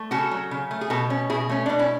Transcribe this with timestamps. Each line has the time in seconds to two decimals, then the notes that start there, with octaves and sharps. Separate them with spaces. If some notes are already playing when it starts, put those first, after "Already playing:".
Already playing: A3
0.11 C#3 F#4 A4
0.31 F#3
0.51 C#3
0.71 A3
0.81 G#4
0.90 B2 F#4 A4
1.10 C#4
1.30 B2 E4 G#4
1.49 A3 C#4
1.66 B2 D4
1.79 C#4 E4